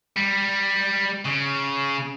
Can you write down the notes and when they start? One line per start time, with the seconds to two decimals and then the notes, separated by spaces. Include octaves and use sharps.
0.16 G3
1.26 C#3